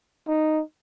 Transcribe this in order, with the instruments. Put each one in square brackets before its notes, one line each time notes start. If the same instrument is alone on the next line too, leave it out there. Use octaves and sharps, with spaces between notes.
[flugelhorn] D#4